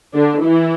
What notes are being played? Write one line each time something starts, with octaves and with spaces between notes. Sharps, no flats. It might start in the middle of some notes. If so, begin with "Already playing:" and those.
D3 D4
E3 E4